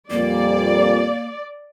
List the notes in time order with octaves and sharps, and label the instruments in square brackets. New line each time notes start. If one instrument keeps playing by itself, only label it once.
[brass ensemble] F2 A#2 G3 [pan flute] A#3 [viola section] D5